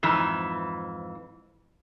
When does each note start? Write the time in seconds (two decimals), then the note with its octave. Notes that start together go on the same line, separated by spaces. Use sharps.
0.03 F2 G#2 E3